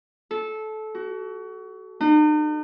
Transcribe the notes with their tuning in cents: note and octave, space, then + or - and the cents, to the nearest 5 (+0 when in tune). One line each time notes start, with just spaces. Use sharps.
A4 -20
F#4 +30
D#4 -45